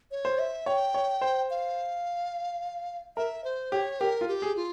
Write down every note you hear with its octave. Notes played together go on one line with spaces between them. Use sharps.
C#5
C5
E5
C#5 G5
C#5
C5
F5
A#4 E5
C5
G4 C#5
G4 A#4
F4
G4
G#4
F4